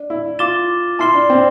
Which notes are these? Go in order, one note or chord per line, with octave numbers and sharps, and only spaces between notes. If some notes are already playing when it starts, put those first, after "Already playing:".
Already playing: D4
E4
F4 D6 A6 E7 G7
E4 A5 C6 F6 C7 G7
D4
C4